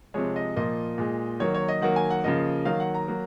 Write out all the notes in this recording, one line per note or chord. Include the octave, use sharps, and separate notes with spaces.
C3 F3 G#3 C#5
D#5
A#2 F3 A#3 D#5
A#2 G#3
D#3 F#3 A#3 C#5
C#5
D#5
D#3 F#3 A#3 F#5
G#5
F#5
C#3 F3 A#3 D#5
D#3 F#3 A#3 F5
F#5
A#5
F#3 A#3